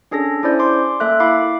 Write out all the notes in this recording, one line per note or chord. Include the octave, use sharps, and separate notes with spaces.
C#4 D4 G#4 A4 A#6
C#4 E4 C5 D5 G6
C6 D6
A#3 A4 E5 F#6
E4 F5 B5 D6